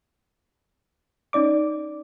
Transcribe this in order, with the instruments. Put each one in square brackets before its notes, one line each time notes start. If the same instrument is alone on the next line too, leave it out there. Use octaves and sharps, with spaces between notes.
[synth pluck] C#4 D#4 D5 D6